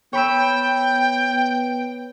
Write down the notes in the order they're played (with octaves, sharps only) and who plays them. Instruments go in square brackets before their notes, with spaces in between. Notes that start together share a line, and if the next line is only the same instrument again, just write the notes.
[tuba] B3 [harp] C#5 B5 E6 [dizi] G5